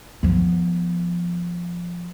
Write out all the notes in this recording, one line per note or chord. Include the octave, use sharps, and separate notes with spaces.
F3 B3